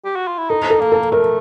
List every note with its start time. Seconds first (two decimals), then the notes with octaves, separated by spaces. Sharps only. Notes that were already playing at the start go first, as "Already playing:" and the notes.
0.05 G4
0.16 F#4
0.28 F4
0.38 E4
0.50 D#4 A4
0.70 A4
0.81 A#3
0.92 A4
1.12 A3 A#4